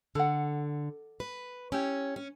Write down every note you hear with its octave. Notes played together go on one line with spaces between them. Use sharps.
D3 A4 F#5
B4
C#4 E4 G4
C#4